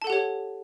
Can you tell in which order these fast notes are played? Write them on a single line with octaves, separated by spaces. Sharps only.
A5 A4 F#5 G4 C#5